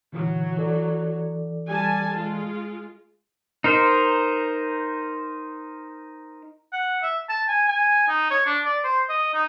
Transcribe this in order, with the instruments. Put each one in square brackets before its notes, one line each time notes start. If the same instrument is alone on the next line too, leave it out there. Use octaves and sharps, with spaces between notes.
[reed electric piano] A#2 D3 E3 [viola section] F#3
[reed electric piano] E3 A4 D5
[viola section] G3 G#5 A5
G#3 F4
[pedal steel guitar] D#4 A#4 C5
[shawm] F#5
E5
A5
G#5
G#5
D#4
C#5
D4
D5
C5
D#5
D#4